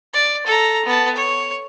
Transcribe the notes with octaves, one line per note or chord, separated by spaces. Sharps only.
D5
A4 A#5
B3 A5
C#5